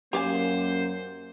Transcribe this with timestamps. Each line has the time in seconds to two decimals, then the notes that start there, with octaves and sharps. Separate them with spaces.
0.13 F#2 A#3 G4 C5 F5 G#5